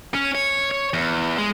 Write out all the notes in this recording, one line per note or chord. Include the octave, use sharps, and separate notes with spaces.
C#4
C#5
C#5
E2
G#3